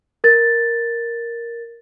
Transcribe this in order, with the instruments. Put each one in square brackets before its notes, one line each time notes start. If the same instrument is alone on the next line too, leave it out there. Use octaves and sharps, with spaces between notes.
[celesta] A#4 A6